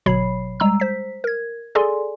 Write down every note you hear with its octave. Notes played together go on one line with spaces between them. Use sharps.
G1 B2 F#3 C#5 B5 C7
G3 G#3 A#5 E6
C5 B6
A#4 G#6
G#4 A4 D5 G#5 C6